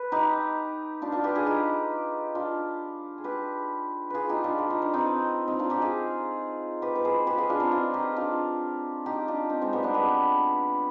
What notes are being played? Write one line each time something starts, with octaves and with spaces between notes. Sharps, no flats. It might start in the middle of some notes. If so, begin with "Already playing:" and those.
Already playing: B4
D#4 G4
D4 F4
D4 F4
G4 B4
F4 G#4
D#4 G4
D4 F4
G#4
G4 B4
F4 G#4 B4
D#4 G4
D4 F4
F4
D#4
D4
C4 D#4
C4 D#4
D4 F4
D#4 G4
F4 G#4
G4 B4
B4
G#4 C5
G4 B4
F4 G#4
D4 F4
C4 D#4
D4 F4
D#4 G4
D4 F4
D#4 G4
D4 F4
C4 D#4
G#3 C4
G3 B3
B3 D4
G4 B4